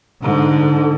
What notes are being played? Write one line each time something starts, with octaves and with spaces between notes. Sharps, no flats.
G#2 D3